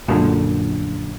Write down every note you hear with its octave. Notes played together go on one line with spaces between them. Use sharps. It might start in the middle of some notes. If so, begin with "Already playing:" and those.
A#1 F#2 A#2 D3